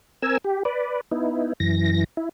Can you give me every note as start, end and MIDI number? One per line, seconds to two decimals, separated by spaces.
0.22 0.38 60
0.22 0.38 70
0.22 0.38 80
0.22 0.38 88
0.44 0.63 67
0.65 1.01 71
0.65 1.01 74
1.11 1.53 59
1.11 1.53 63
1.11 1.53 64
1.60 2.04 42
1.60 2.04 52
1.60 2.04 94
2.17 2.29 64